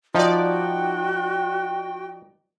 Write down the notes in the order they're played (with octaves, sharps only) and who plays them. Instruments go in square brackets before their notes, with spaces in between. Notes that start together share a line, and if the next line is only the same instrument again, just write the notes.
[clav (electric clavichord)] F3 [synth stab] D#4 D5 [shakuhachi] F#4 [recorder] G5